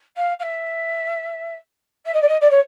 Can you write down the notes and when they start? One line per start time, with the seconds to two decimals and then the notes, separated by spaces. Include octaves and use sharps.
0.16 F5
0.39 F5
0.42 E5
2.05 E5
2.14 D#5
2.22 D5
2.28 D#5
2.41 D5
2.50 C#5